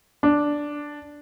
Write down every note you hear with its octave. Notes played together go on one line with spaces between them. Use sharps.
D4